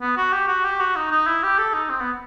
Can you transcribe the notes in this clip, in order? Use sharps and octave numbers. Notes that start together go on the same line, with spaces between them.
B3
F#4
G4
F#4
G4
F#4
D#4
D#4
E4
G4
A4
D#4
C4
B3